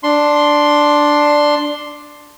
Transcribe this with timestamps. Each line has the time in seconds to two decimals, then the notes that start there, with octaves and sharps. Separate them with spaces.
0.03 D4 C6